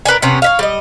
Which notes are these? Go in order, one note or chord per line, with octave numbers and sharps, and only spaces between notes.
A#4 B4 D5 G#5
C3 B3 C#4
C#5 E5 F5
G3 D#5